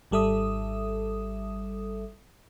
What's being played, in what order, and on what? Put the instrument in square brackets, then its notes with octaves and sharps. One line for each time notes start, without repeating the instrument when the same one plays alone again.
[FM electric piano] G#1 G3 A4 E5 D#6